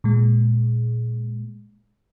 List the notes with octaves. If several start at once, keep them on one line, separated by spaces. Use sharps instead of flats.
A#2 G#3